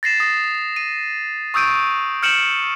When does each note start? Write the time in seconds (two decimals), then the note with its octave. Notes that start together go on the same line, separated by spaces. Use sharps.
0.03 A6 A#6 C7 E7
0.20 D#6 A#6
0.76 D#7
1.54 C#6 D#6 E6 G6 D7 D#7
2.23 F6 G6 C#7 D7 E7 F#7